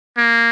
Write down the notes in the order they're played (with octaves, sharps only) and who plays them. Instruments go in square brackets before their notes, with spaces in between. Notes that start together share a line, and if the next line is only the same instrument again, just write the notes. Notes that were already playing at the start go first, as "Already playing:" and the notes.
[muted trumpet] A#3